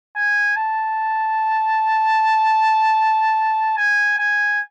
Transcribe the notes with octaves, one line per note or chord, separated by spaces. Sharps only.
G#5
A5
G#5
G#5